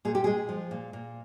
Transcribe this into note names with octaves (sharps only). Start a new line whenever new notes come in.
A#2 G#4
G4
G#3 G#4
F3
A#2
A#2